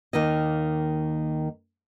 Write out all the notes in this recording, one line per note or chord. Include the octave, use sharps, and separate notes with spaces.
D#2 D#3 A#3 D#5